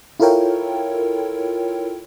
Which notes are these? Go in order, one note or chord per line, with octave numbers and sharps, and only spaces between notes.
E4 F4 A4 A#4 C#5 G5